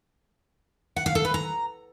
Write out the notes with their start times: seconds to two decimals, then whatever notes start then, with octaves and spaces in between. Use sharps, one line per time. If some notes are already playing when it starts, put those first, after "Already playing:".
0.96 F#5
1.06 F5
1.15 A4
1.25 B4
1.34 A#5